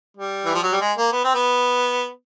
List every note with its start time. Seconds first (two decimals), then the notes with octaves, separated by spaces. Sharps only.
0.17 G3
0.45 E3
0.54 F3
0.63 F#3
0.72 G3
0.81 G#3
0.97 A#3
1.12 B3
1.24 C4
1.34 B3